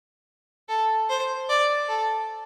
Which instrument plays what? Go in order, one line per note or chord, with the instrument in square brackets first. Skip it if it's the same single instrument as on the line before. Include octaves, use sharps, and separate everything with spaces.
[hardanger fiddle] A4
C5
D5
A4